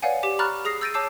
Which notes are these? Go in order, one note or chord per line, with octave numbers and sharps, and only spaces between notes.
B4 C#5 D5 F5 F#5 G#5
G4 D6 B6
A#5 B5 C#6 F6 F#6 A6
G#4 D#6 A#6 C7
E6 G6 A6 A#6 D7 D#7
C#5 A5 D6 E6 G6 C7